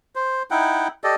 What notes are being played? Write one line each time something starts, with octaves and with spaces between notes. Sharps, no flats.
C5
D#4 E4 F#5 G5
G4 A4 D5 D#5